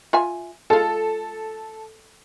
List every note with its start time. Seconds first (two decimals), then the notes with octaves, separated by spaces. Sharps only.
0.13 F4 E5 G#5
0.70 G#3 F4 A4